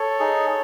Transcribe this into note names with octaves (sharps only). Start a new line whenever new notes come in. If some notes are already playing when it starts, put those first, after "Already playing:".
Already playing: A4 C#5
D#4 G#4